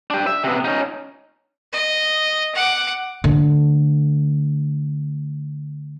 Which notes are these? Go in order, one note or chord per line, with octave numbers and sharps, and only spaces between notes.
D4 G4
E5
C3 B3
C#4 D#4
D#5
F#5 D6
D3 A3